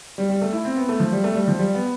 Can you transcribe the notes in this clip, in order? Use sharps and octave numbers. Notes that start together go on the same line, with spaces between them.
G3
G3
A3
E4
C4
B3
A3
F3
G3
A3
G3
F3
G3
B3